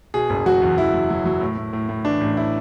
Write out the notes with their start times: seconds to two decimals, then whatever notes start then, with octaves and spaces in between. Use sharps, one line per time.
0.14 B2 G#4
0.30 F#1
0.46 F#3 F#4
0.62 E2
0.78 E2 E4
0.94 F#3
1.10 F#3
1.25 F#3
1.41 A2
1.58 A2
1.73 A2
1.89 A2
2.05 E3 D4
2.21 A1
2.37 E4